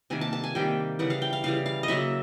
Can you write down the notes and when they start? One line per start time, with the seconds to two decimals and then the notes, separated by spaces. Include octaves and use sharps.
0.10 C3 D#3 G3 A#3 G#5
0.21 A5
0.33 A5
0.44 G#5
0.55 C3 D#3 G3 A#3 G5
0.99 C#3 E3 G3 F#5
1.10 F5
1.22 G5
1.33 F5
1.44 C#3 E3 G3 F5
1.66 F5
1.83 D#5
1.88 C#3 F#3 A#3 E5